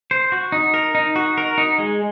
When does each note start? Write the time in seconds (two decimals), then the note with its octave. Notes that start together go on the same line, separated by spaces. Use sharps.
0.11 C5
0.32 F#4
0.52 D#4
0.74 A#4
0.95 D#4
1.16 F#4
1.38 A#4
1.58 D#4
1.79 G#3